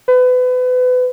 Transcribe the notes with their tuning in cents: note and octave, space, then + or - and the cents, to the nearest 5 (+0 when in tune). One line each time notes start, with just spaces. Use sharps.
B4 +30